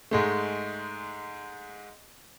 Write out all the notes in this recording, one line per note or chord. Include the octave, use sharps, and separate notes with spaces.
G#2 G#3 A3